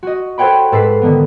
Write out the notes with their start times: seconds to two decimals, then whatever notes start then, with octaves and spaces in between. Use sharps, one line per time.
0.03 F#4 D#5
0.38 A4 C5 C#5 F#5 G5 B5
0.72 G#2 A4 B4 B6 C7
1.02 D3 D#3 B3